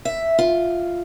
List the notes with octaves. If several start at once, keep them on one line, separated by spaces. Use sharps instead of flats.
E5
F4